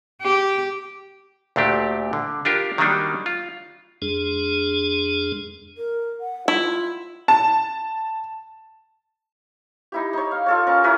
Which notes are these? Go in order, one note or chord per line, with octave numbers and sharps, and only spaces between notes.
G4
D2 A#2 A3 D4 G4
D3
D4 F4 G4 A#4
D#3 F#3 G3 A#3 D4 D#4
F4
F2 G#3 D4 G#4
A#4
F#5
E4 F4
A5
D#4 E4 G4
D#4 C#5
F5
F4 A4 C#5
C#4 A#4 A5
E4 A#4 B4 C#5